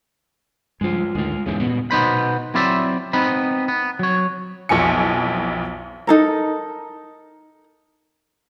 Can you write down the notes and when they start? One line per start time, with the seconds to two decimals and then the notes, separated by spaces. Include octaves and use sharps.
0.81 G2 C#3 F3 G#3 F4
1.15 D2 A2 D#3 G#3 F4
1.46 E2 G#2 C#3 G#3 B3 G4
1.60 A#2 B3
1.91 B2 B3 D#4 C5 B5
2.54 F#3 C4 E4 C5 D5 E5
3.13 B3 C4 D#4 B5
3.68 B3
3.99 F#3 C#5
4.69 B1 F2 E4 G#5 C#7
6.07 D#4 A4 A#4